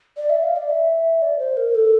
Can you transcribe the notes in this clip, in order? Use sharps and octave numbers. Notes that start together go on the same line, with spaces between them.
D5
E5
F5
D5
E5
D5
C5
A#4
A4